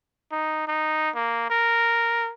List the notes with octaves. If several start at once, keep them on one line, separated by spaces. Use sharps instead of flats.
D#4
D#4
A#3
A#4